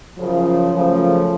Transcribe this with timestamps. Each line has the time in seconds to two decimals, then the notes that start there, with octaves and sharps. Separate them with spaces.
0.18 F#2 C#3 F3
0.72 F#2 C#3 F3 A3